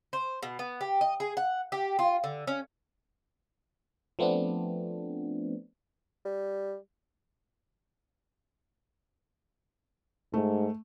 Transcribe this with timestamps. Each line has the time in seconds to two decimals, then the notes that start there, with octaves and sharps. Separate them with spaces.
0.13 C5
0.43 B2
0.59 B3
0.81 G4
1.01 D#5
1.20 G#4
1.37 F#5
1.72 G4
1.99 F4
2.24 D3
2.47 C#4
4.19 F3 A3 B3 C4 D4
6.25 G3
10.34 G#2 A3